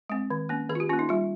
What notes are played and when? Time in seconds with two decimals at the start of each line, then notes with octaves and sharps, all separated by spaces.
0.10 G#3 C4
0.30 D#3
0.49 A#3 C#4
0.69 D#3 G#4
0.75 F4
0.80 G4
0.89 C#4 F4
0.93 A#3
0.99 D#4
1.09 G3 F4